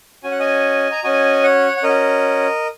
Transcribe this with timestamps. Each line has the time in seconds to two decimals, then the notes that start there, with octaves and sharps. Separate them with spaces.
0.23 C#4 F#4 G#5
0.31 F#5
0.39 D#5 G#5
0.92 A#5
1.04 C#4 F#4 D#5 G#5
1.43 C#5 F#5
1.77 F#5
1.83 C#4 F#4 A#4 D#5